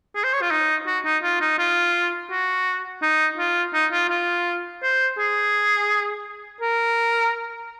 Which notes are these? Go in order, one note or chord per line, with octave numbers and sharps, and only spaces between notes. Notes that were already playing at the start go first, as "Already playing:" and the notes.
G#4
C5
C#5
F4
D#4
F#4
D#4
F4
D#4
F4
F#4
D#4
F4
D#4
F4
F4
C5
G#4
A#4